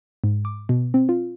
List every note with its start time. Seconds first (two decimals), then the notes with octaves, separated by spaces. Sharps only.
0.24 G#2
0.45 D6
0.69 B2
0.94 C4
1.09 F4